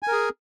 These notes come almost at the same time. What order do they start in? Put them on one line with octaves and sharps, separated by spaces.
G#5 A#4 G#4